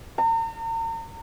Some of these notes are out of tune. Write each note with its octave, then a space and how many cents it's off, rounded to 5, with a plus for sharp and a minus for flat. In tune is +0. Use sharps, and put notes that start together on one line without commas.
A#5 -40